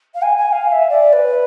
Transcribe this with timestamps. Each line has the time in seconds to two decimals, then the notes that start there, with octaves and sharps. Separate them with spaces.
0.14 F5
0.22 G#5
0.37 G#5
0.52 F5
0.67 F5
0.71 E5
0.89 D5
1.12 B4